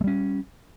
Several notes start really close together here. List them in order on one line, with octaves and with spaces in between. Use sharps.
A3 G3 C#4